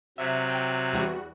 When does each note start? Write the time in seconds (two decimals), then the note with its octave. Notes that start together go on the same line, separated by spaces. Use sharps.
0.18 C3 F#3 E5
0.49 G5
0.93 E2 G3 F#4